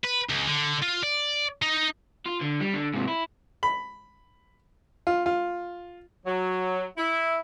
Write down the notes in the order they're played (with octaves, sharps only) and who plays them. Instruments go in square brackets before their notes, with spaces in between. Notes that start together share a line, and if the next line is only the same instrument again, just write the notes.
[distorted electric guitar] B4
C#2
D3
F4
D5
D#4
[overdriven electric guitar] F4
D3
G3
D3
G#2 C3
E4
[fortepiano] B5
F4
F4
[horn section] F#3
E4